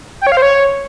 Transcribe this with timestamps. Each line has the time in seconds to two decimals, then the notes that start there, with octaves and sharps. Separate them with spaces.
0.21 G5
0.27 C#5
0.32 F5
0.37 C5
0.42 C#5